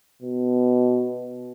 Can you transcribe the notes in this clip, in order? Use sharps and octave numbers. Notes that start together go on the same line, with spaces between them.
B2